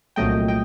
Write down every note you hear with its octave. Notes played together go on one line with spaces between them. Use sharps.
C2 A#2 F#3 A3 D#5 G5
D#5 G5